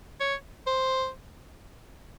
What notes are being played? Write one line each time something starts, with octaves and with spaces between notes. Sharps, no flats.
C#5
C5